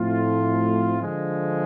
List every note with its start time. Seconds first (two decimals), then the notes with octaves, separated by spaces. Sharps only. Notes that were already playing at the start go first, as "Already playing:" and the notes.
Already playing: A2 F3 A3 C4 F4
0.99 D3 F3 G#3